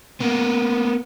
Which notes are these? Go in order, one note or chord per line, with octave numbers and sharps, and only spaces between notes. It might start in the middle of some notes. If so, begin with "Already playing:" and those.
A#3 B3